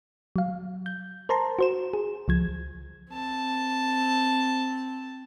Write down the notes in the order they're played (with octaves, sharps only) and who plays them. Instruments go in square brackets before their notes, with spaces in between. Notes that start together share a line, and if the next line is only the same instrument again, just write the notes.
[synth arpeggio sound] F#3 F5
G6
A#4 C5 A5 A#5 C6
F#4 C5 E7
G#4
C#2 F3 G#6
[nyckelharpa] C4 A5